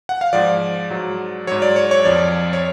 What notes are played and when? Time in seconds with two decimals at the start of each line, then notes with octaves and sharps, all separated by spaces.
0.09 F#5
0.21 F5
0.33 G#2 F3 D5
0.90 G#2 F#3
1.47 G#2 F#3 C#5
1.62 D5
1.76 C#5
1.91 C#5
2.05 F2 F3 D5
2.53 C#5